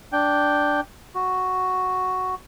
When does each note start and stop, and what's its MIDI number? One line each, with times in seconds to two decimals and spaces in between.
0.12 0.81 62
0.12 0.81 79
1.15 2.35 66